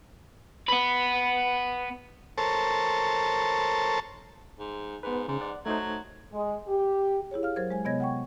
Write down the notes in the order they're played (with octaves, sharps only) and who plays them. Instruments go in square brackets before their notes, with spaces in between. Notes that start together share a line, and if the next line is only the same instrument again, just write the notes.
[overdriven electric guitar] B3 B4
[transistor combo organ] A4 A#4 C5 C#5 A5
[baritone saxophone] G#2
[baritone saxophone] G#2 [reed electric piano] B3 B4
[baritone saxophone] G#2 [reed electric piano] C#3
[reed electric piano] D5 F#5
[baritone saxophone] F#3 [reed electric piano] A3 D#4 C5
[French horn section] G#3
G4
[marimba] E4 G4 G#4 C#5
F5 F6
F#3 A#4 C5 G#6
G#3 C5 G#5
C3 B3 C#5 D#5 G#6 A#6
F#5 G5 C#6